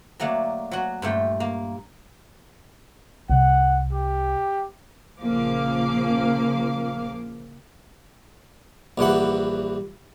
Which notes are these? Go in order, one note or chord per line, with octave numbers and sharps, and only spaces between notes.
F#3 A3 A#3 D4
F#3 F#4
G2 A#2 A3 G5
A#3
C2 F#5
G4
A#1 C#3 F3 A#3 F5 D6
A#1 G2 E3 F#5